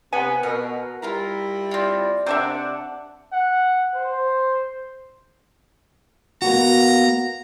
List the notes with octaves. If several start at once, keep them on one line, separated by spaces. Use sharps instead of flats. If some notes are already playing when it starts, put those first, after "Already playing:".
C3 B3 G#5
B2 A#4
G3 E4 F4 A#4 A#5
C4 F4 D5
C3 D4 C5 D5 E5 F#5
F#5
C5
A#3 B3 F#4 A#5